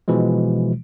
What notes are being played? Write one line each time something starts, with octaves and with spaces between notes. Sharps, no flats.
B2 E3 F3 G#3